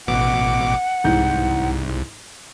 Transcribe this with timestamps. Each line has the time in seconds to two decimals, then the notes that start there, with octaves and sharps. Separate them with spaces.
0.07 A1 B2 F#5 D6
1.04 C2 G#2 E3 G6